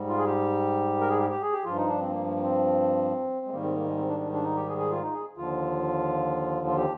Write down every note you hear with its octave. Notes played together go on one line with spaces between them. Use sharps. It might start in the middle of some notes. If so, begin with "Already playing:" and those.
Already playing: G#2 G3
F4
G#4
G4
A#4
G#4
G4
G4
G#4
G4
G2 F3 F4
D#4
D4
C4
A#3
A#3
A#3
C4
G#3
G#2 D#3 G3 A#3
C4
A#3
G#3
C4
D4
D4
D4
D#4
G4
G#4
G#4
F4
D#4
G#4
D#2 D3 F3 F4
F4
G4